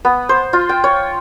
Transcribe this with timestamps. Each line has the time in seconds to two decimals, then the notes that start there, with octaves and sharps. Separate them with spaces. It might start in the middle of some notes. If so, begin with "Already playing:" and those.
0.05 B3
0.29 C5
0.53 F4
0.69 G5
0.84 C#5